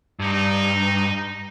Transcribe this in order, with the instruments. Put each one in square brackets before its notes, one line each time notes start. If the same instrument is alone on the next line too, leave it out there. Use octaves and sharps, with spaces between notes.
[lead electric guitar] G2 [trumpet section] D#4